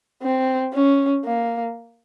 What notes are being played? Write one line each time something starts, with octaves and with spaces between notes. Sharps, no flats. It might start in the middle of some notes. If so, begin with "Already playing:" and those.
C4
C#4
A#3